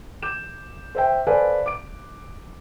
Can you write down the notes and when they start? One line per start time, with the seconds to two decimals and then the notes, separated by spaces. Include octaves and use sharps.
0.23 D6 G6 E7
0.95 C5 E5 G5
1.27 A4 B4 C5 D5 F5 G#5
1.66 D6 D7